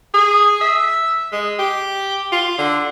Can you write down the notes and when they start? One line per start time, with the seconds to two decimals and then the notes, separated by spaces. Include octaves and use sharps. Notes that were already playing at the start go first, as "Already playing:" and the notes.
0.14 G#4
0.61 E5
1.32 G#3
1.59 G4
2.32 F4
2.58 D3